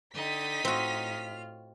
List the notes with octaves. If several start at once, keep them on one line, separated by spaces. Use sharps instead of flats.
D3 D#4 D#5 G5 A6 B6
A2 C4 F4 F#4 F6